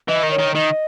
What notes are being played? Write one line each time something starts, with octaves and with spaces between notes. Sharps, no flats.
E3 D#5
D#3
C#5
D#3
D#3 D#5